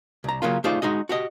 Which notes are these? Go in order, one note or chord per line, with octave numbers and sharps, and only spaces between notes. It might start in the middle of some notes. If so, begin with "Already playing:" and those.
C2 A#5
C#3 F#3 A#3 C#4 F4
A3 D#4 F4 G#4 C5 D5
G#3 D#4 F#4 D#5
F#4 G4 D#5